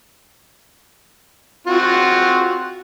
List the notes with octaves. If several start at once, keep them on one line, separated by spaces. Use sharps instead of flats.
C4 F4 F#4